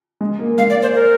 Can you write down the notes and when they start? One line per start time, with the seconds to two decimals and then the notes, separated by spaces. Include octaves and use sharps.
0.21 G#3
0.39 A#3
0.58 G#3 F5
0.70 D5
0.82 C5
0.95 A#4